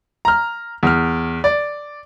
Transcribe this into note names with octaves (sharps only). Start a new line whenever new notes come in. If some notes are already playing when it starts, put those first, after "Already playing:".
A#5 F6
E2 F6
D5